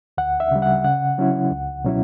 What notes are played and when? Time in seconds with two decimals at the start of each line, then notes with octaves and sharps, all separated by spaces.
0.18 D2 F#5
0.40 E5
0.51 C#3 G3
0.62 F#5
0.84 C#3 F#5
1.18 F#3 C#4 E4
1.51 C#2
1.84 B2 F#3 C#4 E4